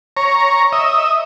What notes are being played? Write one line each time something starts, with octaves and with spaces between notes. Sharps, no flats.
C#5 A#5
D#5 E5